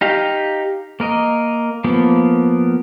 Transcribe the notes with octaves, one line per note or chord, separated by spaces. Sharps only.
D#4 G4 F5
A#3 A#4 D#5
F3 A#3 B3